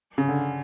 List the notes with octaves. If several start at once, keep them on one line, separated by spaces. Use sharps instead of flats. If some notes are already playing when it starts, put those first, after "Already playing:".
C#3
D3